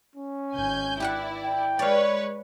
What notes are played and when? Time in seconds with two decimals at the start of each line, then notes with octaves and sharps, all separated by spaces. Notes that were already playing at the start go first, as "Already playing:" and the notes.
0.16 C#4
0.54 G#1 G#5 G6
1.00 E4 G4 B4 D5 F#5
1.45 G5
1.79 G#3 B4 C#5 D5 F5